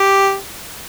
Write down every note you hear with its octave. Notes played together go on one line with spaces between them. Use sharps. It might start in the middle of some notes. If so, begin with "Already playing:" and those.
Already playing: G4